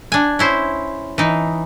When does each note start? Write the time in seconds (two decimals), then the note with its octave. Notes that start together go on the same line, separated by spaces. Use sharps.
0.12 D4 G#5
0.39 C#4 E4 C5
1.18 E3 D#4